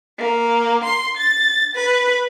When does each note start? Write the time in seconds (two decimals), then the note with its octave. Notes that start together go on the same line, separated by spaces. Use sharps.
0.19 A#3
0.86 C6
1.18 A6
1.76 B4